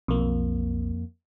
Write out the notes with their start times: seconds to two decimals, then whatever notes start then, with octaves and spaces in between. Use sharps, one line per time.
0.08 B1 F2 A#3